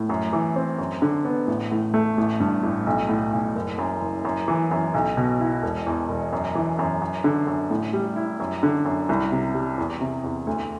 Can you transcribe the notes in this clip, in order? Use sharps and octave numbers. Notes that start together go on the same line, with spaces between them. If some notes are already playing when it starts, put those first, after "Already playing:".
Already playing: A2
F#2
E3
C4
F#2
D3
B3
A1
A2
A3
A1
G2
A1
B1
A2
B1
F#1
F#2
F#1
F#2
E3
F#2
B1
B2
E4
E1
E2
E1
F#2
E3
F#2
F#2
D3
F#2
A2
G3
E4
F#2
D3
F#2
C2
C3
G3
E2
C3
E2
D2